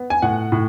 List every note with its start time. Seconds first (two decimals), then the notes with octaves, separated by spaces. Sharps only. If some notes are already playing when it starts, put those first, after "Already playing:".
Already playing: B3
0.10 G#5
0.22 A2 F#5
0.52 A2